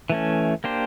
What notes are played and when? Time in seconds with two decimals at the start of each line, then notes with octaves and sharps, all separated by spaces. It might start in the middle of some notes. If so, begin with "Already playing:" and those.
0.10 E3 A3 C#4
0.64 A#3 D4 G4 C5